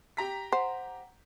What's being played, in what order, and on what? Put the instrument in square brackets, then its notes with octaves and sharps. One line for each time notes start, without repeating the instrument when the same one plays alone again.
[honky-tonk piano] G4 A#5 B6
[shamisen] C5 [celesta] F#5